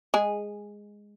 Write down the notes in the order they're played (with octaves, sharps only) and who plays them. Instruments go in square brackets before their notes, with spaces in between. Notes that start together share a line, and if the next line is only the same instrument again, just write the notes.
[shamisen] G#3 G#4